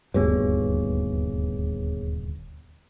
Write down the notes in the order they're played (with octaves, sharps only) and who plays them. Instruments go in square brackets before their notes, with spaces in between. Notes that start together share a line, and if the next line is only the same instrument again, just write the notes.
[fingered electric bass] D#1 D2 G2 [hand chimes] B3 G#4 C#5